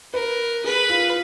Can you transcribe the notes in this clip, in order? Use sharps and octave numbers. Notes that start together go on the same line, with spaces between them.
A#4 B4
G#4 B4
F4